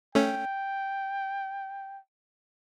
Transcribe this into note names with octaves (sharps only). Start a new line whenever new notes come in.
A3 C#4 G5